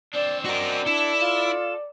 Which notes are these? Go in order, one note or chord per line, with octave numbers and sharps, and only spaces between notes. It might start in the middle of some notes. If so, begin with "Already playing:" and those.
C4 D4 D5
F#4 A#4 D5 D#5
D4 E4 A4
F4